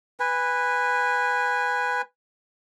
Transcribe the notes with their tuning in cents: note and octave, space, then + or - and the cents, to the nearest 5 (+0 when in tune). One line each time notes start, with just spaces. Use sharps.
B4 +0 G#5 -20